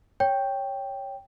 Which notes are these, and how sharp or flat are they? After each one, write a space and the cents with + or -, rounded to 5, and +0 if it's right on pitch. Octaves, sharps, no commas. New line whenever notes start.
C#5 +0 G5 +0